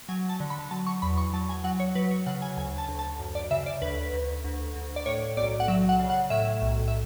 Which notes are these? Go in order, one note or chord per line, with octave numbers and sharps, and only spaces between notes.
F#3 G#5
A5
D3
B5
F#3 A5
C#6
E2 B5
C#6
F#3 A5
G#5
F#3 F#5
C#5
F#3 B4
C#5
C#3 F#5
G#5
D2 G#5
A5
D2
A5
F#2
D5
C#3 E5
D5
D2 B4
D2
D2
D2
D5
A2 C#5
B1 D5
F#5
F#3 E5
F#5
C#3
F#5
A2 E5
B1
E5